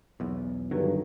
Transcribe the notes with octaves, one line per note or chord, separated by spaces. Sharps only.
B1 E2
G2 D3 D#3 F#3